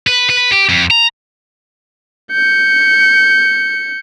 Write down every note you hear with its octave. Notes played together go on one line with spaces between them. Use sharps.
B4
B4
G4
F2
A#5
G6 C#7